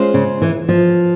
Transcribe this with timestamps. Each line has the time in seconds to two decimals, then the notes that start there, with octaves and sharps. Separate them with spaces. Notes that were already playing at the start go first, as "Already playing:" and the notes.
Already playing: G#3 C#4 F4 C5
0.14 C#3
0.42 E3
0.69 F3